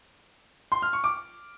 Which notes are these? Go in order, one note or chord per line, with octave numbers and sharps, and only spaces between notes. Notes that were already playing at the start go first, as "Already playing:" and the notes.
C6
F6
C#6
D6